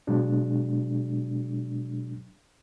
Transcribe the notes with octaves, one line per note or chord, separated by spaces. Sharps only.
B2 F#3 G#3 D4